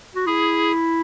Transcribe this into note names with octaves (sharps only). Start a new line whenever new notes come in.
F#4
E4 G#4